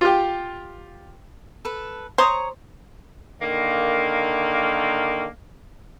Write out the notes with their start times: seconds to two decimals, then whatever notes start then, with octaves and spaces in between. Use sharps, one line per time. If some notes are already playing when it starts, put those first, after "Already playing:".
0.01 F4 G4
1.65 A4 B4
2.18 C5 C#5 A#5 D#6
3.42 D3 D#3 A#3